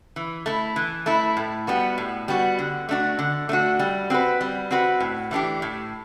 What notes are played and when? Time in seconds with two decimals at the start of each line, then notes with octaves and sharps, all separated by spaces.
0.16 E3
0.46 A3 E4
0.76 E3
1.06 A3 E4
1.37 A2
1.67 G3 B3 F#4
1.98 A2
2.28 G3 B3 F#4
2.59 D3
2.89 A3 D4 F#4
3.19 D3
3.49 A3 D4 F#4
3.79 G3
4.10 C4 F#4 B4
4.41 G3
4.71 C4 F#4 B4
5.00 A2
5.31 E3 A3 D4 G4
5.62 A2